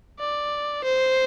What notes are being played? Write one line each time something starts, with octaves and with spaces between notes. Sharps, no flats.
D5
C5